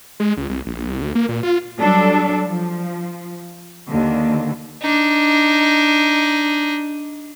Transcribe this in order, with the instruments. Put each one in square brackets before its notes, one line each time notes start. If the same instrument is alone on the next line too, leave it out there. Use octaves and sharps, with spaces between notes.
[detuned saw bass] G#3
C#2
C2
A#1
C2
D2
A#3
A#2
F4
[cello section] F#3 G3 D4 A4
F3
D#2 D3
[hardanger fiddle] D4 D#4